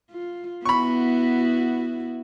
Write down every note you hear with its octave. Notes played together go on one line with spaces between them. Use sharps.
F4
B3 E4 F#4 B5 C#6